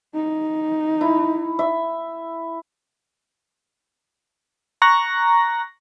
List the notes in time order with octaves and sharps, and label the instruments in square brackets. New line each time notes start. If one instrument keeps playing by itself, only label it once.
[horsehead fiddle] D#4
[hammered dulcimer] E4
E5
[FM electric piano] A#5 C#6 F#6 A#6